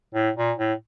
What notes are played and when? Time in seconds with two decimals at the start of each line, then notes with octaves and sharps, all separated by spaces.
0.14 A2
0.37 A#2
0.58 A2